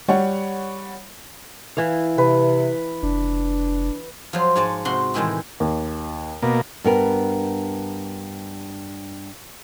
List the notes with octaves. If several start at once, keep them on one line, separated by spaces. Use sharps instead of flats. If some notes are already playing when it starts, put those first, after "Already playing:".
G3 C#5 F#5
E3 E4 F5
C3 B4
F1 D4
F3 F#3 C5
G#2 C#5 D5 G#5 A5
C3 F#4 C5 F#5 C6
A2 D#3 E3 G#3 E4 G4
D#2
B2 A#3
G2 B3 A#4